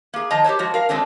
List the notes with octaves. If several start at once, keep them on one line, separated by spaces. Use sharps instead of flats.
A#3 G#4
D#3 F3 D#5 A5 A#5
G4 A4 C5 C#5
F3 G#3 F#4
A#4 F5
F#2 F#3 G#3 A3 C4 D4